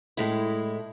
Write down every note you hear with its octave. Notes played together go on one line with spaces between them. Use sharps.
A2 G#3 E4